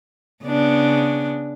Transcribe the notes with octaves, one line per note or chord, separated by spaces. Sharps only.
C#3 B3 D4